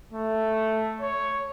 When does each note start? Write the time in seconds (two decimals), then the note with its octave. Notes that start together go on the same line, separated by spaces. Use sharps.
0.13 A3
1.01 C#5